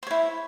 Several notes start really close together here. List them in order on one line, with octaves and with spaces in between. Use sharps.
C5 C#5 E4